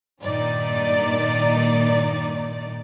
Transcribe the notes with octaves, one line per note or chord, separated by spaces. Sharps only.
G2 A#2 D#3 D#4 D5